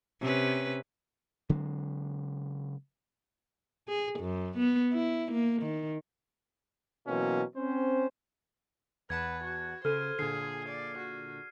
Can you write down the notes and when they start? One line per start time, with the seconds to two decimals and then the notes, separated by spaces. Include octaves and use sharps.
0.21 C3 C#4 B4
1.49 C#3 F#3 G#3 C4
3.88 G#4
4.20 F#2
4.58 B3
4.93 E4
5.32 A#3
5.62 D#3
7.08 B2 E3 F#3 A#3 C4 C#4
7.56 C4 C#4 C5
9.10 E2 B4 F#5 A5 G#6
9.44 F#4
9.85 C#3 A4 C5 F6 D#7
10.19 A#2 D3 G#4 C7
10.69 D5
10.98 F#4